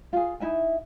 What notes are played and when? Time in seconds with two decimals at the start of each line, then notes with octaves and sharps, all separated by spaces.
0.13 F4 G#4
0.40 D#4 E4 E5 G#5